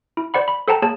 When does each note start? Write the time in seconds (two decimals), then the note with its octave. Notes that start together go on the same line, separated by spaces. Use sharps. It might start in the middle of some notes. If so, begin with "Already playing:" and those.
0.17 E4
0.34 C5 D5 F#5 B5
0.48 B5
0.68 A4 C5 F#5 G5 A5 A#5
0.82 A#3 G#4 C#5 A5